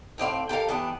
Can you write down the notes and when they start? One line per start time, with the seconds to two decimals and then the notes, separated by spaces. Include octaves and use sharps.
0.18 A2 C4 D5 F5
0.49 G4 A4 A#4 F5
0.68 E3 B3 D4 G4